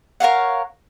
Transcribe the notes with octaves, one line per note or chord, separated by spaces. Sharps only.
A#4 C#5 F5 F#5